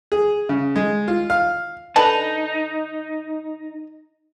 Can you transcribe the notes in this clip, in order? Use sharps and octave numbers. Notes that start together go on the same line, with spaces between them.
G#4
C#3
G#3
F4
F5
D3 D#4 B4 A5